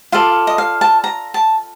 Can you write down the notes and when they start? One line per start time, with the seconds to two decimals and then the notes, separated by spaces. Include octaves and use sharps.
0.12 F4 A4 D5 F5
0.47 D#5
0.58 F5
0.81 A5
1.04 A#5
1.34 A5